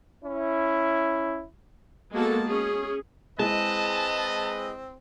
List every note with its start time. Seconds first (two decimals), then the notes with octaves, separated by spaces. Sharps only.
0.25 C#4 E4
2.13 G#3 A#3 B3 F#4 A4 A5
2.45 C#4 G#4
3.39 G#3 C4 E4 B4 D#5 A5